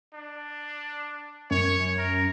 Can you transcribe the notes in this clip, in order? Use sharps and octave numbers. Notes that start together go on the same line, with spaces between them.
D4
F#2 C#5
A#4